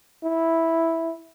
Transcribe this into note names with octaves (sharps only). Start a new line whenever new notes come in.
E4